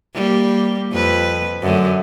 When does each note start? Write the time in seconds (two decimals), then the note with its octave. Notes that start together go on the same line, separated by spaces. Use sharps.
0.15 G3 A#3
0.92 F2 B4
1.62 F#2 D3 A3